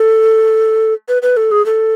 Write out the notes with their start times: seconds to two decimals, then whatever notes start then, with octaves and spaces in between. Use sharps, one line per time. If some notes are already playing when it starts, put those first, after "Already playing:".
Already playing: A4
1.08 B4
1.22 B4
1.37 A4
1.51 G#4
1.66 A4